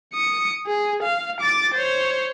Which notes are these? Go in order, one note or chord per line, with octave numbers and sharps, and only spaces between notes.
D#6 C#7
G#4
F5
D6 A6
C5 C#5